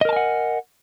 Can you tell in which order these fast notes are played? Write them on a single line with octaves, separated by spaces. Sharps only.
D#5 A#4 A5 G#5 F#5